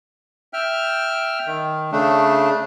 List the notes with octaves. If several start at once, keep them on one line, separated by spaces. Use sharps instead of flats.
E5 G5 F6
D#3
C#3 A3 D4